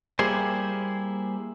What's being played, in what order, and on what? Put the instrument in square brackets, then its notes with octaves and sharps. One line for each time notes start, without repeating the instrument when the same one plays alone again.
[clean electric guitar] G3 A#3 E4 G4 G#4 C5